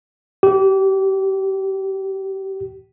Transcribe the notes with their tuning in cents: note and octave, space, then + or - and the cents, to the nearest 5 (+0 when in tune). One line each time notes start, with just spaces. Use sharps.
G4 -30